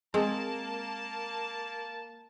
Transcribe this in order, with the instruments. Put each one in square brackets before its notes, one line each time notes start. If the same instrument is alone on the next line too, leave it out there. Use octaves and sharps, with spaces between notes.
[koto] G#3 C4 [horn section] A#3 A5